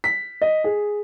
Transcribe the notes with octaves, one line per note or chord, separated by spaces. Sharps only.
B6
D#5
G#4